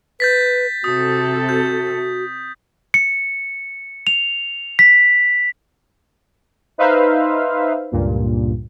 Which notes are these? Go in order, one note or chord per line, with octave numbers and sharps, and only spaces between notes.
B4 G6 A6 B6
C3 F#4 A4 D#6
F#4 G6
C#7
F7
B6
D#4 B4 C5 E5 F5
C#2 G2 A#2